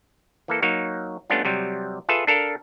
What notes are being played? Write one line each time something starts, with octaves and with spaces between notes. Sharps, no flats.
E3 A#3 A4
F#3 A#3 D#4 C#5
G3 A3 B3 C#4 D4 F4
C3 F#3 G3
F4 G#4 A4 B4 E5
D4 A4 A#4 F5